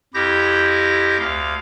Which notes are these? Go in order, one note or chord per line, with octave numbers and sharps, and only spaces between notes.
F2 E4 G4 G6 A#6
D2 F5